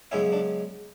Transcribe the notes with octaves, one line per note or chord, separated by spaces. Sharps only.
F#2 C#3 G#3 B3 C#4 E4
D4